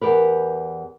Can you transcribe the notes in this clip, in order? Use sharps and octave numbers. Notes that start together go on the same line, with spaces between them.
E2 G4 A#4 B4